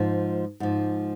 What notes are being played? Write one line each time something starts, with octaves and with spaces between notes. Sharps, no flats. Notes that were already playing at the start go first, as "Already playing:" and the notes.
Already playing: G#2 F3
G#2 F3